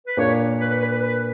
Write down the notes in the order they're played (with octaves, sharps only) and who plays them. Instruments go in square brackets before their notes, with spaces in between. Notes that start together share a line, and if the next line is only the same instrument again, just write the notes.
[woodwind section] B4
[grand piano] A#2 A#3 D4 A#4 [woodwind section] C#5
[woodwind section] B4
B4
B4
B4
B4